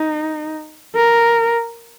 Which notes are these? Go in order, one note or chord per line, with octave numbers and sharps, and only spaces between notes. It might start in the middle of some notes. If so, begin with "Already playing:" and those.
Already playing: D#4
A#4